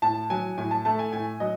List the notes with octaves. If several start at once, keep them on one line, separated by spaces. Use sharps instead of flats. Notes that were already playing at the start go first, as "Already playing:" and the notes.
A2 A5
F#3 G#5
A2 G#5
A5
A3 A5
G#5
A2 G#5
F#3 D#5